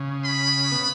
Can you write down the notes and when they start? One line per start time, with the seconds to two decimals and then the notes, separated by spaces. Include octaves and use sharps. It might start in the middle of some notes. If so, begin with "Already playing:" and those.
Already playing: C#3
0.25 B5
0.71 B3